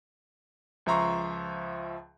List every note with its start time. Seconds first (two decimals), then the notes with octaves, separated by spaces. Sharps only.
0.86 C#2 F3 E5 A#5 C6 C#6